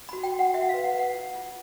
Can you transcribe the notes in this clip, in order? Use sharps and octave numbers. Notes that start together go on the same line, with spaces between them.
F#4 B5
G5
F#4
F#5
F#4 E5
F#5
B4 F5
F#5
B4 F#5
F4
F4